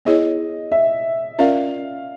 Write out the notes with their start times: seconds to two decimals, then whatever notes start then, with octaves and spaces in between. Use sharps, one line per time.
0.05 B3 E4 G#4 C#5 D#5
0.72 E5
1.39 C#4 F4 A#4 D5 F5